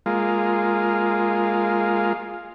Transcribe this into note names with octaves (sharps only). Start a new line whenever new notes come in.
G#3 A#3 F4